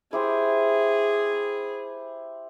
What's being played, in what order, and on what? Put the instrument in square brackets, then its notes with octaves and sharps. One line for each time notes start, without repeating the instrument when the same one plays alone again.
[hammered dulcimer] E4 G4 C5 [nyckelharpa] G#4